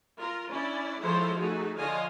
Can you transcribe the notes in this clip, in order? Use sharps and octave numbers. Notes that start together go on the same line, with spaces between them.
F4 A#4
C#4 D4 E4 D5
F3 G#3 E4 A4 C5 C#5
A3 D#4 F#4 G#4
D3 F3 C#5 D#5 F5 G#5